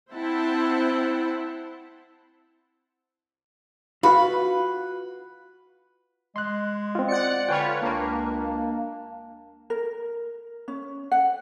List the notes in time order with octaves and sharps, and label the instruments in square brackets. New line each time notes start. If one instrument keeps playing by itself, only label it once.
[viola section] C4 E4 C5 E5 F#5 A5
[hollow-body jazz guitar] F4 F#4 F5 [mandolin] B4
[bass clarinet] G#3 [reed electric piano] C6 F#6
[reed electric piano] C4 F4
[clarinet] D5 [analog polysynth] F#5 C#7
[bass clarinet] D3 [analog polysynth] F4 B4 C#5 [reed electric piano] G5 G#5 F6
[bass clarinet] C#2 [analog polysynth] A#3 [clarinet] D4
[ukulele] A#4
C#4
F#5